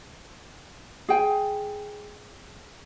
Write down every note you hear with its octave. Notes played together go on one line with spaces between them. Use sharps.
G#4 G5 G#5